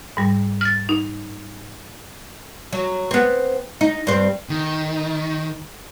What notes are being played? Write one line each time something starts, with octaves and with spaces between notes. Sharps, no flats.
G#2 G3
F6 A6
D#4
F#3
B3 C4
D#4
G2 C4
D#3